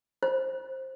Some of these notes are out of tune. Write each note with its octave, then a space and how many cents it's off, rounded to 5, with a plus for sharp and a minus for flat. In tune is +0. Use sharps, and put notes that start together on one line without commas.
C5 +10